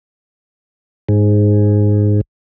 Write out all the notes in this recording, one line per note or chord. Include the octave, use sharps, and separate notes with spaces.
G#2